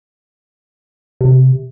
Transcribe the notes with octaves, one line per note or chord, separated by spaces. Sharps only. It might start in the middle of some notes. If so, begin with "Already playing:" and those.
C3